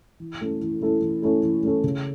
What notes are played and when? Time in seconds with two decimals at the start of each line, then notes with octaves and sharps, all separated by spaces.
0.20 E3
0.41 A3 C#4 E4 A4
0.62 E3
0.81 A3 C#4 E4 A4
1.02 E3
1.22 A3 C#4 E4 A4
1.43 E3
1.63 A3 C#4 E4 A4
1.84 C#3